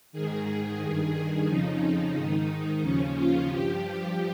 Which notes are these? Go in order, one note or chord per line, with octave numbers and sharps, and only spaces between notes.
G#2 D#3 G#4
G2 D#3
F2 C#3 F3 D#4
G#2 D#3
D#2 C#3 F3 C#4
F4
G2 F3 G4
G4